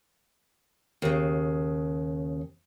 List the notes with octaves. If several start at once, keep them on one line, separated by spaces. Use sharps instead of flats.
D#2 C#3